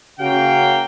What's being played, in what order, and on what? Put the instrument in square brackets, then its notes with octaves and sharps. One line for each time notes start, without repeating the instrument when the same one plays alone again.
[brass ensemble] C#3 A#3 C#4 F#4 F5 G5